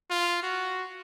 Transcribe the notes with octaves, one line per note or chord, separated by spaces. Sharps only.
F4
F#4